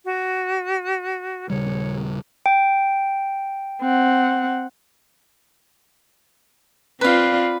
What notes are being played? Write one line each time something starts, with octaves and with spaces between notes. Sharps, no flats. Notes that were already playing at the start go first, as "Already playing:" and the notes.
F#4
D#1 C#3 G3 C#5
G5
C4 F#5
C4 F4 B4 D5 F5